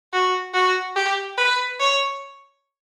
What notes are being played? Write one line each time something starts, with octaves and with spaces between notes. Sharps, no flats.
F#4
F#4
G4
B4
C#5